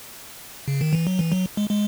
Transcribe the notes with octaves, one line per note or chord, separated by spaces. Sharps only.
C#3
D#3
E3
F#3
E3
F#3
G#3
G#3